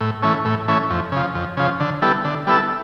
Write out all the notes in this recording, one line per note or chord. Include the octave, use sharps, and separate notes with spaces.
A2
E3 A3 C#4
A2
E3 A3 C#4
F2
C#3 F3
F2
C#3 F3
D3
G3 B3 E4 A4
D3
G3 B3 E4 A4